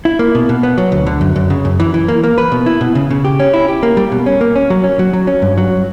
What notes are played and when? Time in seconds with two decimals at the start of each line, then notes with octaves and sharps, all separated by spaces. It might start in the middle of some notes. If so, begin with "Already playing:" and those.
0.05 E4
0.19 A#3
0.35 B2
0.49 B2
0.63 B3
0.78 F#3
0.92 D2
1.07 D3
1.21 F#2
1.36 F#2
1.50 C#3
1.65 F#2
1.80 E3
1.94 E3
2.08 A#3
2.24 A#3
2.38 B4
2.52 B2
2.66 E4
2.81 B2
2.95 C#3
3.11 C#3
3.25 G4
3.40 C#4
3.54 E4
3.68 G4
3.83 A#3
3.97 G3
4.12 B2
4.26 C#4
4.41 A#3
4.55 C#4
4.70 F#3
4.84 C#4
4.99 F#3
5.13 F#3
5.27 C#4
5.42 G2
5.58 F#3